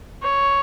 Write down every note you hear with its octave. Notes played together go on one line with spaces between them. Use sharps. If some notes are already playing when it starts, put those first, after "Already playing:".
C#5